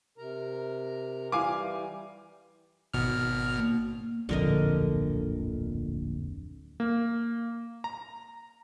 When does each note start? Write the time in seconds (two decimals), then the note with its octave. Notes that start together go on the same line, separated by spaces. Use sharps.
0.18 C3 A#4 A#5
1.32 E3 G3 F5 G#5 D6
2.94 G#1 B2 F6
3.57 A#3
4.29 D1 A#1 F2 D3 A#4 D#5
6.80 A#3
7.84 A#5